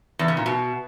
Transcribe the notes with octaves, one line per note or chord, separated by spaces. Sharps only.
E2
C#3
A#2
B2